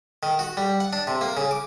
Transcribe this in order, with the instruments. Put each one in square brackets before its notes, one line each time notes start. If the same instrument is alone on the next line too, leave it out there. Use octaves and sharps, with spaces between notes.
[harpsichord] D#3
F#4
G3
F#5
D4
C3
A#3
C#3
D6